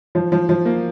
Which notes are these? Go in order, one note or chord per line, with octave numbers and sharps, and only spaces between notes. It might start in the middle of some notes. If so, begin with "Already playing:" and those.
F3
F3
F3
A#3